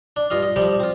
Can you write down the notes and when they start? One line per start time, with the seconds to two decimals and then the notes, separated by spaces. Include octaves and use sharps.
0.16 D4
0.30 G2 F4 D#5 F5
0.43 D#5
0.56 F3 G3 G4 G5 A5
0.80 C4 F4